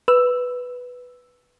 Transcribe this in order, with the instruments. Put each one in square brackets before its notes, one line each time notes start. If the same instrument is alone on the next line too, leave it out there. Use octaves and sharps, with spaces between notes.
[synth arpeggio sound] B4 E6